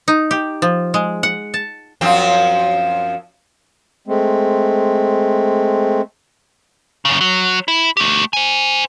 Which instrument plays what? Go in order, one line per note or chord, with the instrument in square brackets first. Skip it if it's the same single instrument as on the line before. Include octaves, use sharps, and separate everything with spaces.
[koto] D#4
G4
F3
G#3
F#5
A5
[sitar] F#2 F3 C4
[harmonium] G#3 A3 C4
[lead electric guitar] F#2 C#3
F#3
E4
A3 G4
C5 G#5